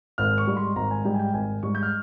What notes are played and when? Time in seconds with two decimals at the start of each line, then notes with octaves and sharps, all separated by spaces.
0.18 G#1 F6
0.38 C#6
0.47 G#2 G3
0.57 C6
0.76 G#1 A#5
0.91 G#5
1.05 G#2 G3 G5
1.14 G#5
1.19 G5
1.33 G#1 G#5
1.63 G#2 G3 C#6
1.75 G6
1.83 F6